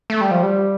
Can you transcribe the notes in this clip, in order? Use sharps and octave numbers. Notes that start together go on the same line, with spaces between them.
A3
G3
F3
G3